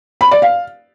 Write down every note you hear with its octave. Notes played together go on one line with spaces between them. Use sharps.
B5
D5
F5